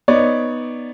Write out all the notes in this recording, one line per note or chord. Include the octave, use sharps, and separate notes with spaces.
B3 D#4 C#5 D5